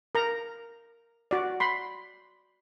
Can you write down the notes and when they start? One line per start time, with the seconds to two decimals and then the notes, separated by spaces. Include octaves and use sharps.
0.15 A#4 A#5
1.31 F#4 D5
1.60 B5 C6